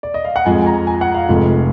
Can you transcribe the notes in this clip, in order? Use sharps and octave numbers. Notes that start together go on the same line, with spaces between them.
D5
D#5
F5
F#5
F2 F3 G#3 G#5
G#5
A#5
G#5
F#5
F5
F1 F2 F3 G#3